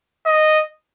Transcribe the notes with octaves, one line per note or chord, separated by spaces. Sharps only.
D#5